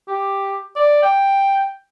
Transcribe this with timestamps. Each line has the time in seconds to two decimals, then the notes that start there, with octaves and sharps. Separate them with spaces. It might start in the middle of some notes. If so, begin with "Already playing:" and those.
0.08 G4
0.76 D5
1.02 G5